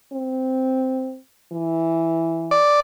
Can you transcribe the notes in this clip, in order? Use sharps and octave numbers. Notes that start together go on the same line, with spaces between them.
C4
E3
D5